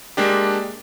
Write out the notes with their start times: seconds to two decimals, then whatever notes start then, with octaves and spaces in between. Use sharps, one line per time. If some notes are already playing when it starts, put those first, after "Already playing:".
0.17 G#3 A#3 D4 G4